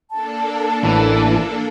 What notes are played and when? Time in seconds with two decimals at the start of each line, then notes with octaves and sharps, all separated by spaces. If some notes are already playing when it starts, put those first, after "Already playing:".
0.11 A#3 D4 A4 A5
0.84 A1 E3